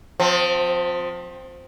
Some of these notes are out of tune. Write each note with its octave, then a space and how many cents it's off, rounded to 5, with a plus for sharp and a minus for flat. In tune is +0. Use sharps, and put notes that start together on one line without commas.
F3 +35 C4 +0